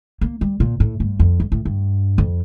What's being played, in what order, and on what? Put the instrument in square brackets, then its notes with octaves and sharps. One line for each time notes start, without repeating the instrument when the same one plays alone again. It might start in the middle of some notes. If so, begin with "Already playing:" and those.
[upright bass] A#3
G3
A#2
A2
G2
F2
G2
A2
G2
F2